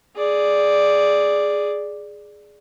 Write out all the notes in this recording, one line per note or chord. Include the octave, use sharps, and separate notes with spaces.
G#4 D5